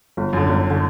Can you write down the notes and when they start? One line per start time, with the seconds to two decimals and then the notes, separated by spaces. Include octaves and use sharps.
0.17 G1
0.33 F#2 D3
0.49 G1
0.70 D3